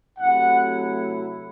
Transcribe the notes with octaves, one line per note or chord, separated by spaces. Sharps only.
C3 F#3 A3 E4 F#5